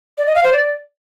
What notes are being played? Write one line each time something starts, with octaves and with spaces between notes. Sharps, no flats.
D5
D#5
F5
C5
D5